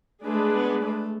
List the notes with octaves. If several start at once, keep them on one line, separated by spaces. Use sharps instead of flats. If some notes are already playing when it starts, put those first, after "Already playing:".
G#3 A3 D4 G#4 B4
B3
A3